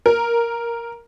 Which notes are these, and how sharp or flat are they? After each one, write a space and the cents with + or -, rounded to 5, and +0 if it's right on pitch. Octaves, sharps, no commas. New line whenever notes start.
A#4 +5